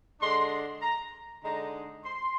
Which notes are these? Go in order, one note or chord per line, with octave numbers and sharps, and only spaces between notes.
D3 G#3 D4 C6
A#5
D3 G#3 D#4 A#5
C6